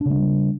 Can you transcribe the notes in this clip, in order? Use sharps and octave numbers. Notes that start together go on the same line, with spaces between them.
C#3 G3 G#3 D4